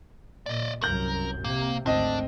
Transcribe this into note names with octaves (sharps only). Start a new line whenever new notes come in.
A#2 D5 D#5
C2 F#2 A#4 G6 F#7
C3 A#3
G#1 D2 C4 D4 D#5